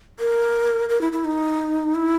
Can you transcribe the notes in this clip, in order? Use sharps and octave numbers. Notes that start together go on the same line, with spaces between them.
A#4
A#4
E4
E4
D#4
E4